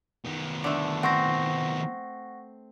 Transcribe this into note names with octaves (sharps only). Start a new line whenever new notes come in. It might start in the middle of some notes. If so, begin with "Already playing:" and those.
D#3 B3
D3 A3
C4 F#5 C#6 A#6